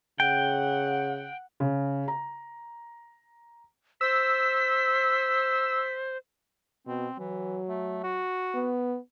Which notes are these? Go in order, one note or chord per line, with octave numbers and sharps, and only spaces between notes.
C#3 F#5 G5
C#3
A#5
C5 E6 B6
B2 C4
E3 F#3
A3
F#4
B3